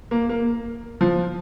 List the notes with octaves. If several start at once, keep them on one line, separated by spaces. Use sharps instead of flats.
A#3
A#3
F3